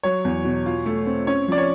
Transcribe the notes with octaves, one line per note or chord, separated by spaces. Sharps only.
F#3 C#5
E2
B2
F4
A3
C4
C#4 C#5
F3 D5
C#5